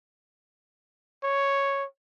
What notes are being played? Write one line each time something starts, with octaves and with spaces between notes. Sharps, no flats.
C#5